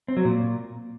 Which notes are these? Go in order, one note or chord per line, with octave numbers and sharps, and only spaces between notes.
C4
F#3
A#2